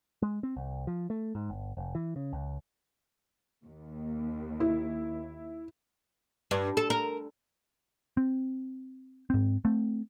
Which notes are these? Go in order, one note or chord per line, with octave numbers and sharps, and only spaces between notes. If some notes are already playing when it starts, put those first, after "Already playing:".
G#3
C4
C2
F3
A3
G#2
G1
F1
E3
C#3
C#2
D#2
E4
G2
A4
A#4
C4
G#2 C4
A3 C4